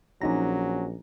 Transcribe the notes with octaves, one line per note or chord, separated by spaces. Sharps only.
A#1 F3 F#3 C#4 D#4 A#5 A#6